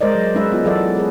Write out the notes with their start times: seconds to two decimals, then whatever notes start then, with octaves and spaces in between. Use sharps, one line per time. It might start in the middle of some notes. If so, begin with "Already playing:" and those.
0.01 G#3 A#4 C5 D5 D#5
0.15 F#3
0.35 G#3 C#4 D#4 B4 E5
0.52 B3 F4
0.64 E3 F#3 A4 D5 E5
0.97 G#4 B4